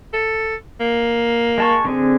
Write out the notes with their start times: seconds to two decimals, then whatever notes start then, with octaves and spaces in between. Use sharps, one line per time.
0.13 A4
0.80 A#3
1.58 G#3 A5 C#6
1.85 D3 C4 G#4